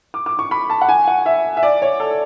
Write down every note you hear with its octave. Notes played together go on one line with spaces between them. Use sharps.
D6
D6
C#6
B5
A5
F#5
G#5
F#5
E5
E5
D5
C#5
A4